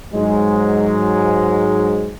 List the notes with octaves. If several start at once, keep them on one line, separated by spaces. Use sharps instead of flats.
G#2 F#3 G#3